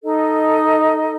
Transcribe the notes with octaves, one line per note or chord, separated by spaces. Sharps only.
D#4 A4 D#5